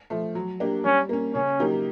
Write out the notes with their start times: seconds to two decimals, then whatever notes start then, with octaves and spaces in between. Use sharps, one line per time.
0.10 F3 A3
0.35 F#3
0.60 A#3 D4 G4
0.85 G3 C#4
1.09 A#3 C#4
1.34 C#3 C#4
1.59 F#3 A#3 D#4 G4